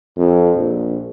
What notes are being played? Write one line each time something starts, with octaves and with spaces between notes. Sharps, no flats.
F2
A#1